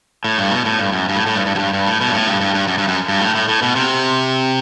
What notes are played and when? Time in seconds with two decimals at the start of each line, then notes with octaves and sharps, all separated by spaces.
0.24 A2
0.38 G2
0.51 B2
0.65 A2
0.79 G2
0.92 F#2
1.09 G2
1.16 A2
1.26 A2
1.35 G2
1.46 G2
1.55 F#2
1.59 G2
1.73 G2
1.87 A2
2.01 B2
2.09 G2
2.14 A2
2.27 G2
2.41 G2
2.54 G2
2.68 F#2
2.78 G2
2.88 F#2
3.08 G2
3.21 A2
3.35 A2
3.48 A2
3.62 B2
3.76 C3